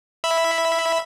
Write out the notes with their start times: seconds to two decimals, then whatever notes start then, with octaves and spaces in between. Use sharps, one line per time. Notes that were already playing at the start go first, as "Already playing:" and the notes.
0.24 E5 B5